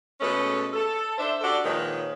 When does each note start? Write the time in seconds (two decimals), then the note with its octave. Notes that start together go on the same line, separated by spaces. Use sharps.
0.21 B2 G#3 A3 C#4 A4 B4
0.73 A4
1.18 D4 C5 E5
1.41 D4 F#4 G4 A4 D5
1.64 A#2 D#3 F3 G#3 B4 C#5